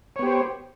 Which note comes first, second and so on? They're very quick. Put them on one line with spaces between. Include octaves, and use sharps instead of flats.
C#5 B3 G4 C5